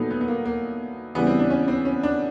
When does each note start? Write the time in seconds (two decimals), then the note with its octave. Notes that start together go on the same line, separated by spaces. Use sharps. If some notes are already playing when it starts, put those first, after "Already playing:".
Already playing: A#2 F#3 A3 B3 D#4
0.10 B3
0.21 B3
0.28 A#3
0.46 A#3
1.15 C#3 E3 G3 B3
1.27 C4
1.39 D4
1.50 C#4
1.68 C4
1.85 C#4
2.03 D4